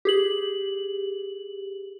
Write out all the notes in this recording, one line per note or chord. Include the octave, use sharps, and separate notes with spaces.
G4 G#4 F#7